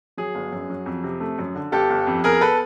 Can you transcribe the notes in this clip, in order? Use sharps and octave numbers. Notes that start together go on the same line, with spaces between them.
F#3 G#4
G1
F#2
F#3
F2
C3
A3
F#2
D3
G1 G4 A4
G1
F2
B3 G#4 A#4
A4 B4